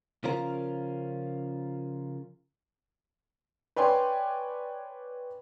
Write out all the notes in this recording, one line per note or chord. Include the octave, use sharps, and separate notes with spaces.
C#3 F3 C#4 F4 A#4
B4 C#5 D5 G5 G#5 C6